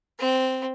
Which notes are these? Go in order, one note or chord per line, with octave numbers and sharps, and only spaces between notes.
C4